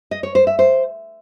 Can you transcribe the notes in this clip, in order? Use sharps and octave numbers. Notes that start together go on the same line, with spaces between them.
D#5
C#5
C5
E5
C5